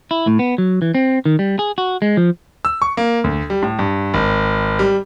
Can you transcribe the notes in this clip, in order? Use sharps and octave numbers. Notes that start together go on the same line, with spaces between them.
E4
A2
B3
F#3
E3
C4
D#3
G3
G#4
F#4
G#3
F3
E6
C#6
A#3
D2
G3
A2
G2
G#1
G3